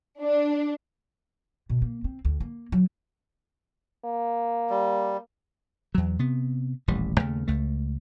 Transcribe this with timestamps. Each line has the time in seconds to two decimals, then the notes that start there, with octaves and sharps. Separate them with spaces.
0.20 D4
1.69 B2
1.82 A#3
2.04 C4
2.25 D2
2.40 A#3
2.72 F#3
4.05 A#3
4.70 G3
5.95 E2 F#3
6.19 C3 B3
6.88 D#1 A1 G3
7.18 D#2 C#3 A3
7.48 C#2 A3